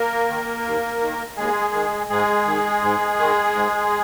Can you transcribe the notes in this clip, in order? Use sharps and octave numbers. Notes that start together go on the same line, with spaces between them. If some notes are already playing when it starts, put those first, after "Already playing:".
Already playing: A#3 A#4
D#3
D#2
D#3
D#2 G#3 G#4
D#3
G#2 G#3 G#4
D#3
G#2
D#3
G#2